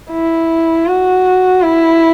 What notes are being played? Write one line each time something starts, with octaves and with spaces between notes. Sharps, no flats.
E4
F#4
E4